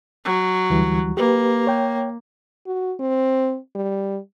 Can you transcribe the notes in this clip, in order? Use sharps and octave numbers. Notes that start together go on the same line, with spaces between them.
F#3
D2 E3 G3
A#3 G4 B4
C#5 G5
F#4
C4
G3